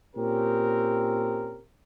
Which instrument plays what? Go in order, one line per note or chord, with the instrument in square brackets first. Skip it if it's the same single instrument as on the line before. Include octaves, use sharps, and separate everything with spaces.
[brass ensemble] A#2 C4 C#4 G4 A#4